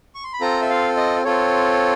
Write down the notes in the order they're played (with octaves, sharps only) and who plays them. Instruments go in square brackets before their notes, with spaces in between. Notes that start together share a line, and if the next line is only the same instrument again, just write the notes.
[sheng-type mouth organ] C#6
C6
B5
C4 F4 A4 A#5
E5
F5
D#5
C4 F4 A4 C#5